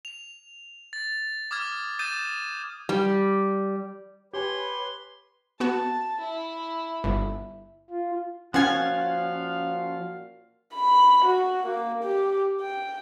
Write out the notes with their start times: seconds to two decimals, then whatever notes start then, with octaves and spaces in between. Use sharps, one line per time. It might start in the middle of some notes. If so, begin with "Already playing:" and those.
0.05 F7
0.93 A6
1.51 D6 D#6 F6 G#6
1.99 D#6 G6 A6 D#7 E7
2.89 G3
4.33 G4 B4 C#5 G#5 C6
5.60 B3 F#4 A5
6.20 E4
7.04 G1
7.90 F4
8.54 A#2 F3 C#4 F4 F#4 F5 F#5 G#5
10.74 B5
11.25 F#4
11.66 A#3
12.04 G4
12.61 G5